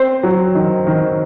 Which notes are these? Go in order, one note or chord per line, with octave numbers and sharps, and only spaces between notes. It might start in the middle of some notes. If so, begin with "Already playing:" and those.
Already playing: C4 C5
F#3
D#3
D#3